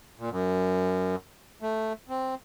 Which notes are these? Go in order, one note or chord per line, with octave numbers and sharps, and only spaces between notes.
A#2
F#2
A3
C4